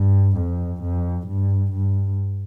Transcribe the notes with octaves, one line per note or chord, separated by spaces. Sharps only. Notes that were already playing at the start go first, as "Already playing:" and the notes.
Already playing: G2
F2
F2
G2
G2